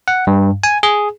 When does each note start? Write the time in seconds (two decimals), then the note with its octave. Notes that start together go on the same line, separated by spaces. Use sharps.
0.08 F#5
0.27 G2
0.64 G#5
0.83 G#4